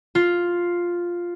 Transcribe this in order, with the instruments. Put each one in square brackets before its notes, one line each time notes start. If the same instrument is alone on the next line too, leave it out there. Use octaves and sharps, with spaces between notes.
[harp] F4